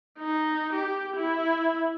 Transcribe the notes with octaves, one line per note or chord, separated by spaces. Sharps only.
D#4
G4
E4